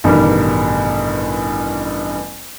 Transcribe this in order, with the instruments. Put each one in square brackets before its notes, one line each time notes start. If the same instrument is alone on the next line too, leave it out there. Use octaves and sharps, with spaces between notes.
[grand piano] A1 G2 B2 D3 D#3 G3